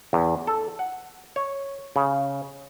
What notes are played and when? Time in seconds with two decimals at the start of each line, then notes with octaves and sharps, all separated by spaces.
0.13 E2
0.47 A4
0.79 F#5
1.36 C#5
1.96 C#3